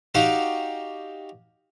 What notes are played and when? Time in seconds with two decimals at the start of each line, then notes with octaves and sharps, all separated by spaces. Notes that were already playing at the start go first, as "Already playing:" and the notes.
0.15 D#4 F#4 G4 D5 F5 F#5